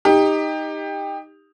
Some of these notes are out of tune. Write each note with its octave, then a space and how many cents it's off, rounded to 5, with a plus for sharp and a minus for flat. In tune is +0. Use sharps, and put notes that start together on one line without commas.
D#4 +0 G4 +20